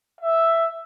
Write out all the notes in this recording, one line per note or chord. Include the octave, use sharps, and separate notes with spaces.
E5